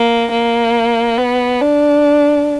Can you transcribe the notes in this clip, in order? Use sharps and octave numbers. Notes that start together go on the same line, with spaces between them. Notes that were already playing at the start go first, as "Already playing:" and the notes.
Already playing: A#3
A#3
B3
D4